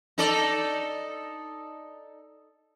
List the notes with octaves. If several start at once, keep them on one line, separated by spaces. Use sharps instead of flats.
D#4 A4 D5